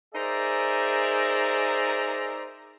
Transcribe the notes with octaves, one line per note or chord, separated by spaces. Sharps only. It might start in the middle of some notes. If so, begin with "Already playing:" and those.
D#4 G#4 A#4 C5 D5 E5